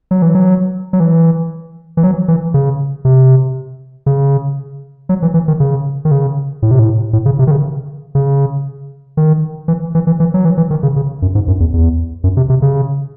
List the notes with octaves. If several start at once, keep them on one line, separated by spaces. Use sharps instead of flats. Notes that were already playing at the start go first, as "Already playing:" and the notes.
F#3
E3
F#3
F#3
E3
E3
F#3
E3
C#3
C3
C#3
F#3
E3
E3
D#3
C#3
D#3
C#3
A2
C3
A2
A2
C#3
C3
D#3
C#3
C#3
D#3
E3
E3
E3
E3
F#3
E3
E3
D#3
C#3
C#3
F#2
G#2
F#2
E2
E2
F#2
C3
C3
C#3